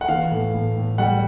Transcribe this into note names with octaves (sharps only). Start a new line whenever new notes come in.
F#5
E3 F5
A2
A2
A2
G3 F#5